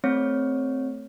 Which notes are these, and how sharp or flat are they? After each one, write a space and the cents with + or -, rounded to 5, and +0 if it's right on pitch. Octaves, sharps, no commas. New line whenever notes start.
A3 +0 C4 +0 C#5 +0